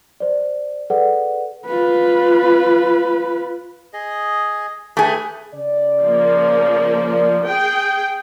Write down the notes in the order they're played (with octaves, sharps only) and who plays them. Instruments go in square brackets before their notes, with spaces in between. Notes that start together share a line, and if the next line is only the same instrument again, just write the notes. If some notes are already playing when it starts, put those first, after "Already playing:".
[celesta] C5 D5
G#4 A4 B4 D5 F#5
[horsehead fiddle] F4 B4
[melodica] G#4 D#5
[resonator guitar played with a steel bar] A3 G#4 [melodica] G4 B4 B5
[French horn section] C#3 D5
[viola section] F3 A#3
G#4 G5